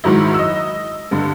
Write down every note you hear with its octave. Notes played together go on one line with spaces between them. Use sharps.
G#2 D#3 F#3 E4
D#5 E6
G2 D3